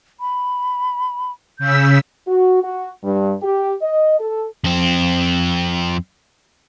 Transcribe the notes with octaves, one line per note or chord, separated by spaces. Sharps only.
B5
C#3 E6 G6 B6
F#4
F#4
G2
G4
D#5
A4
F2 C4